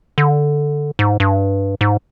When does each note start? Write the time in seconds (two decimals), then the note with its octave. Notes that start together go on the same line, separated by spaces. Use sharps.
0.18 D3
0.99 G#2
1.20 G2
1.81 G#2